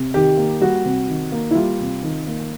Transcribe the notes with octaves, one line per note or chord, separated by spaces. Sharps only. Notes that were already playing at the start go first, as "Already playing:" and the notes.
Already playing: C3
D#3 G4
A#3
G3 F#4
C3
D#3
A#3
E4
G3 F4
C3
D#3
A#3